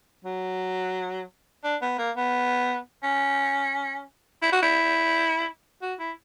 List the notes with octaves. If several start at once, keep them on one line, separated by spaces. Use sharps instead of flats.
F#3
D4
B3
A#3
B3
C#4
E4
F#4
E4
F#4
E4